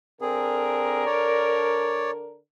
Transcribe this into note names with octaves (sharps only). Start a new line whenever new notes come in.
D3 C4 D4 G#4 A#4
C#5 D5